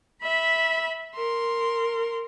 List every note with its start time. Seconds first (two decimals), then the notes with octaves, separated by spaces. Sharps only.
0.22 E5 B5
1.16 A#4 C6